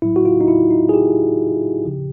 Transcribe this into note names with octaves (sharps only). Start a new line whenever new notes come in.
A2 F#3 E4
F#4
F4
D#4
E4
D#4
G#4
G4
C#3 F3